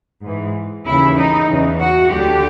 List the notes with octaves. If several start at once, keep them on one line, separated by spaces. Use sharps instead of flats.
G#2 E3
D#2 C#3 E3 E4
D#4
E2 C#3 E3
F#4
D2 D3 G4